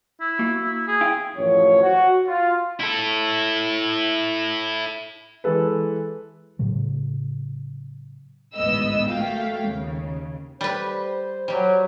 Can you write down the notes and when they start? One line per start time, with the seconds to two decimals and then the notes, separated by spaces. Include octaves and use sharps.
0.21 E4
0.39 A#3 F#4
0.63 E4
0.88 G#4
1.01 E4 F5 G5
1.36 A1 F#2 F3 C#5
1.82 F#4
2.26 F4
2.80 E4 A4
5.44 E3 G#3 A4 B4
6.59 A2 C#3 F#3
8.55 A1 D2 G#2 B3 D#5 E6
9.09 A3 A#3 F#4 F5 G5
9.65 D#2 C#3
10.61 G3 B4 C5
11.48 F#3 G3 G4